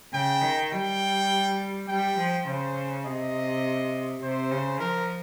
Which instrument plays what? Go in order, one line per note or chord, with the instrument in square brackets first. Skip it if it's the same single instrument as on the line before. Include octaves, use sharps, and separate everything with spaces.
[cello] C#3 [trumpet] G5
[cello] D#3
[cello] G3 [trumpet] G5
[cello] G3 [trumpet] G5
[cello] F3
[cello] C#3 [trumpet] C5
[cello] C3 [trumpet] D#5
[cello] C3 [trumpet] C5
[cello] C#3
[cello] F3 [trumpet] A#4